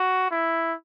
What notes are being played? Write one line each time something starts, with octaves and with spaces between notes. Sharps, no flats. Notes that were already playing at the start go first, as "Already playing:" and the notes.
Already playing: F#4
E4